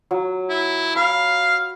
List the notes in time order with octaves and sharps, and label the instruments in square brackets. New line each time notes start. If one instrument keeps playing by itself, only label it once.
[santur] F#3
[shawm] E4
[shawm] F5 [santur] B5